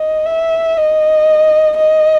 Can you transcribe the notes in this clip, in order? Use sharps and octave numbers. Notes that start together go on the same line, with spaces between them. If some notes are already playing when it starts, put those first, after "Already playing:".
Already playing: D#5
E5
D#5
D#5